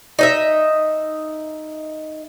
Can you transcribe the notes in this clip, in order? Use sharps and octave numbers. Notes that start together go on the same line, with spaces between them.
D#4 D#5 E5